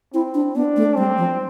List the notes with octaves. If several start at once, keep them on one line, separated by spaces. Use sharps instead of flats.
C4 E4
D4
B3 D4
A3
G3 C4
F3